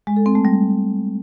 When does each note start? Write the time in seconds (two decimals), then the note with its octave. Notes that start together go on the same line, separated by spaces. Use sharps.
0.07 G#3
0.16 A4
0.26 C4
0.35 A3
0.45 G3